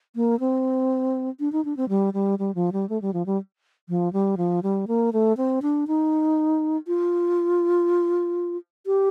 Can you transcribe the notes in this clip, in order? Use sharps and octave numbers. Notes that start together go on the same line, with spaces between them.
A#3
C4
D4
D#4
D4
C4
G3
G3
G3
F3
G3
A3
G3
F3
G3
F3
G3
F3
G3
A#3
A3
C4
D4
D#4
F4
G4